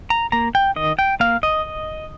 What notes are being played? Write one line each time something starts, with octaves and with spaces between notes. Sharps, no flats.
A#5
A#3 A#5
G5
D#3 D#5
G5
A#3 F5
D#5